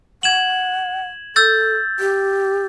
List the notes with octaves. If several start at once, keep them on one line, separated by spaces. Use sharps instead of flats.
F#5 G#6 E7 F#7
A4 E6 G6 A6
G4